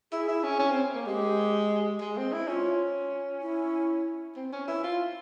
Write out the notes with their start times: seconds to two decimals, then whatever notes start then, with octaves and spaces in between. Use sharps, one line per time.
0.12 E4 G#4
0.28 E4
0.43 C#4
0.59 C#4
0.71 C4
0.95 A#3
1.06 G#3 G4
2.00 G#3
2.17 C4
2.32 E4
2.47 C#4 F4
3.42 E4
4.36 C4
4.52 C#4
4.68 E4
4.84 F4